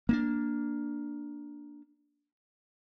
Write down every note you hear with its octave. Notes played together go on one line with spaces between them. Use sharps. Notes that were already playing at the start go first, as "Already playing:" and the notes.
A#3 C4 D4